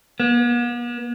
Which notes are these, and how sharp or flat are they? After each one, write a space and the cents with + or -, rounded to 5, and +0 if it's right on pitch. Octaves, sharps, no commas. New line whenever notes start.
B3 -45